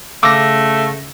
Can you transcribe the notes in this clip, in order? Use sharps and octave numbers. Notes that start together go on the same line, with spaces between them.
C#3 A3 F5 D6 E6 A#6